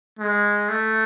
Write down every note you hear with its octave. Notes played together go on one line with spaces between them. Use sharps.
G#3
A3